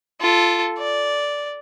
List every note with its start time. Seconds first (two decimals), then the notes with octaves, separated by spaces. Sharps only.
0.21 F4 A4
0.78 D5